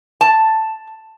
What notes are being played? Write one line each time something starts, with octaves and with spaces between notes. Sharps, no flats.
A5